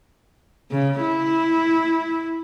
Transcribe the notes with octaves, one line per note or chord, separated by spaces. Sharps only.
C#3
E4